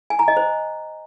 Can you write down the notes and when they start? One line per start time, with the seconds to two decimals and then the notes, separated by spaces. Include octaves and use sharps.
0.10 G#5
0.19 A#5
0.28 D#5
0.37 C5